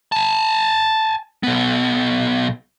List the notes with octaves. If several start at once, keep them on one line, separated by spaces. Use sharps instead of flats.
G#5 A5
B1 B3